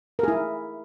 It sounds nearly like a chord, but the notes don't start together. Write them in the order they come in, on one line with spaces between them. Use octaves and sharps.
A#4 G#4 E4